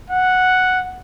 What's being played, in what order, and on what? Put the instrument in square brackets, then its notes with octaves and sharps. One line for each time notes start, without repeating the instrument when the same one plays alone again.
[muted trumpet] F#5